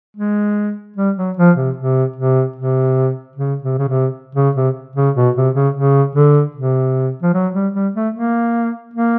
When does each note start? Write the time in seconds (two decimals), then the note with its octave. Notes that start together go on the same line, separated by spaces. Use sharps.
0.17 G#3
0.96 G3
1.17 F#3
1.37 F3
1.57 C3
1.77 C3
2.16 C3
2.56 C3
3.36 C#3
3.63 C3
3.78 C#3
3.89 C3
4.35 C#3
4.56 C3
4.96 C#3
5.16 B2
5.36 C3
5.55 C#3
5.75 C#3
6.16 D3
6.55 C3
7.22 F3
7.34 F#3
7.54 G3
7.74 G3
7.95 A3
8.14 A#3
8.94 A#3